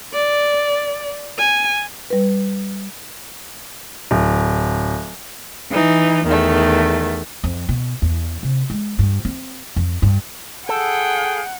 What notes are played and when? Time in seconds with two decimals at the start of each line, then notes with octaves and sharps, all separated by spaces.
0.14 D5
1.38 G#5
2.10 G3 B4
4.11 D1
5.70 E3 D#4
6.25 E2 D#3 A3
7.44 F2
7.69 B2
8.02 E2
8.43 C3
8.70 G#3
8.99 G2
9.25 C4
9.76 F2
10.02 G2
10.69 G#4 A4 F#5 G5